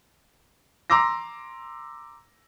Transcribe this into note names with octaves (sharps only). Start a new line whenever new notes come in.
A#5 C6 D6 E6 A#6